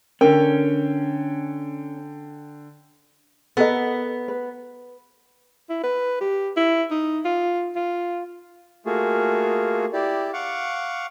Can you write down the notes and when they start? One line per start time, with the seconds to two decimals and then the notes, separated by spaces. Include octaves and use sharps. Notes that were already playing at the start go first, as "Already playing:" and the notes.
0.21 D3 C#4 A#4 G5
3.57 B3 A4 A#4 D#5
4.28 B4
5.70 E4
5.83 B4
6.21 G4
6.57 E4
6.91 D#4
7.25 F4
7.76 F4
8.86 A3 A#3 F4 F#4 G#4
9.93 E4 G4 D5
10.33 F5 F#5 C#6 D6